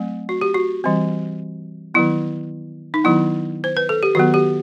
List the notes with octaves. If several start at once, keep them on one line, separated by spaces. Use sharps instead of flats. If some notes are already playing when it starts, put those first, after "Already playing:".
Already playing: F#3 A3 C4
F#4
G4
F#4
E3 G3 C4
D#3 F#3 B3 E4
D#4
D#3 F#3 B3 E4
C5
B4
A4
G4
D#3 F#3 B3 F#4
G4